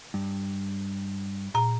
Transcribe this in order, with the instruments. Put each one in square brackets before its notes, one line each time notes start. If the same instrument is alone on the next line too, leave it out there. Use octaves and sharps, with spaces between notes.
[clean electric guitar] G2
[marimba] A#2 A#5